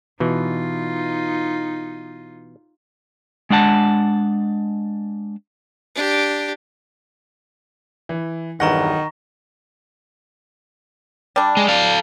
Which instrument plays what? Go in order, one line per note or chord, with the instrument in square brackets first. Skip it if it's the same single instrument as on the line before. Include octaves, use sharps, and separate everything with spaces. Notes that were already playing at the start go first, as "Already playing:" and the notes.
[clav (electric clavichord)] B2 E3 [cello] D#4 F4
[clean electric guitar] G#3 D4 F#5 A5
[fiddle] D4 G4
[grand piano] E3
[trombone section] B1 E2 G2 [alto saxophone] D#3 [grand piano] F#5 [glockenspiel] A#5 C#6 A#6
[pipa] G3 D4
[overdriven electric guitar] G#3
A4 F5